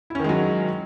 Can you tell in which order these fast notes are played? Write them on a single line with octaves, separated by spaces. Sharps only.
E4 C#4 D#3 G#3 F#3